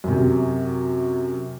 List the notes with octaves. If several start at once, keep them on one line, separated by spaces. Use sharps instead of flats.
F#2 C3